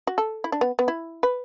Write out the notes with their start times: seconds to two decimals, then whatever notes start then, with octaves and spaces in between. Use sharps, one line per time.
0.07 F#4
0.18 A4
0.44 E4
0.52 D4
0.61 B3
0.79 B3
0.88 E4
1.23 B4